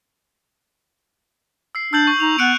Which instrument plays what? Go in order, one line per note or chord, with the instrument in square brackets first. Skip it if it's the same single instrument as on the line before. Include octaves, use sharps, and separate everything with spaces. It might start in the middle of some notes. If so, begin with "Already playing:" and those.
[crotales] E6 C7
[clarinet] D4 [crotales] E6 G6 F#7
[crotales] C#6
[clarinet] D#4 [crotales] F7
[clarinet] B3 [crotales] F#6 C#7 D7